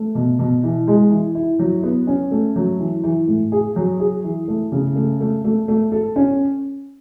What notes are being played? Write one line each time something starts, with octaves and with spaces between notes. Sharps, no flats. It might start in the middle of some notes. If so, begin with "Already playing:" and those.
Already playing: A3
B2
B2
E3
G#3
E3
E4
F#3
B3
C#4
A3
F#3
E3
E3
A2
G#4
F#3
G#4
E3
A3
C#3
A3
A3
A3
A3
A4
C#4